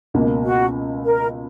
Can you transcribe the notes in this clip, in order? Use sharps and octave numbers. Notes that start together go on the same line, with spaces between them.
C#2 B2 A#3
F#4
A#4